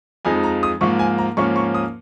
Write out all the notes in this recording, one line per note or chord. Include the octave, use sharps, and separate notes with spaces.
F2 F3 G#3 D#4 G#5
A#5
D#6
G#2 F3 A#3 C#6
G#5
A#5
G#2 F3 A#3 C#4 C#6
C#6
D#6